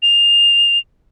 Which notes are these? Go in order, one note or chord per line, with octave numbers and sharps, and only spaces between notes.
F7